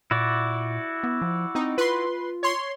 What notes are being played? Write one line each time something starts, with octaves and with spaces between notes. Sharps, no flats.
A#2 E4 F#4 D5
B3
F3
C4 D#4
F4 B4 C6
C#5 C6